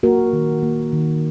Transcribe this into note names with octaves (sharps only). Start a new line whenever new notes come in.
A#3 F#4 A#4
D#3
A#3
D#3